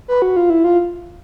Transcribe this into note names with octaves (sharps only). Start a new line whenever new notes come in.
B4
F#4
F4
E4
F4